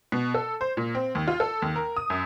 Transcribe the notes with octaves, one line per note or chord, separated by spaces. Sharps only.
B2
A4
C5
A#2
C4
D#2
F4
A4
D#2
A#4
D#6
F#2